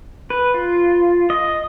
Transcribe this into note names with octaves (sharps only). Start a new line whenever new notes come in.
B4
F4
D#5